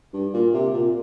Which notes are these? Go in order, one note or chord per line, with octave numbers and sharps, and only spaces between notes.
G2
A#2
C3
A#2